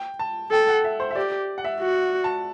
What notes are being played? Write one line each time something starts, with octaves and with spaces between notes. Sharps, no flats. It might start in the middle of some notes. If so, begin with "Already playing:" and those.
Already playing: G5
A5
A4 G5
F#5
E5
C5
E5
G4 D5
F#5
E5
F#4
A5